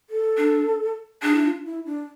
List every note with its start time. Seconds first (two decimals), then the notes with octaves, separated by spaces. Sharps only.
0.10 A4
0.38 D4
1.23 D4 G#4
1.34 E4
1.44 F4
1.65 E4
1.86 D4